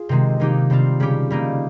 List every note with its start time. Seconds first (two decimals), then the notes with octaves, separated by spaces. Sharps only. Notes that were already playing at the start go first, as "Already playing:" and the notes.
Already playing: F4 G#4
0.09 C3 D#3 G#3 C4
0.40 D#3 A#3 D#4 G4
0.70 C3 G3 C4 F4
1.00 C#3 G3 C#4 G4
1.30 G3 A#3 D#4